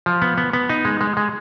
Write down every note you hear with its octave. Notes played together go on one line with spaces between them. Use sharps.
F3
B3
B3
B3
D#4
G#3
G#3
G#3